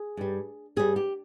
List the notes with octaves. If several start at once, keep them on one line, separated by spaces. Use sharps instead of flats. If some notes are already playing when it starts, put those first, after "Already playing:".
Already playing: G#4
G2 G3
G2 G3 G#4
G4